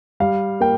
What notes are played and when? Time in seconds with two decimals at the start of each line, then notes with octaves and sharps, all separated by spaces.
0.20 G3 F5
0.60 A#3 G5